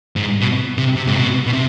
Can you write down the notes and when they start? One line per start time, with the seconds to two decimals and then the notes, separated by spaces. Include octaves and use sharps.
0.16 G#2
0.41 B2
0.78 C3
0.96 C3
1.07 G#2
1.15 B2
1.47 B2
1.53 C3